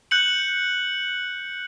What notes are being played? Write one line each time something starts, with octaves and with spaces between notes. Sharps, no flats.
F#6 G6 C#7 F#7